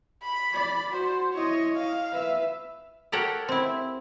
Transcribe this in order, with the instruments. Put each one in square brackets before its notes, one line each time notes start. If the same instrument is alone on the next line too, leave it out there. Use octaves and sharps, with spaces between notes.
[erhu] B5
[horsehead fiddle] D5
[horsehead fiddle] F#4 [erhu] C5
[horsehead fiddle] E4 D#5 [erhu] C#5
[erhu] F5
[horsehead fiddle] B4 E5
[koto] G4 A4 A#4 C#5 F#5 G5
C4 E4